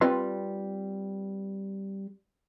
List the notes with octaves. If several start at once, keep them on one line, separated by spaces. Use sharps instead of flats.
G3 C4 F4 B4 C6